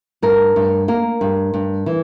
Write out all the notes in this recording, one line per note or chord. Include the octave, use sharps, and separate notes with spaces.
G2 A#4
G2
A#3 A#4
G2
G2
E3